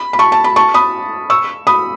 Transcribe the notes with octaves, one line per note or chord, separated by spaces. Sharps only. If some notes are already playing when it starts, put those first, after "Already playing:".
Already playing: B5
B5
A5 C#6
A5
B5
A5 C#6
B5 D#6
C#6 E6
B5 D#6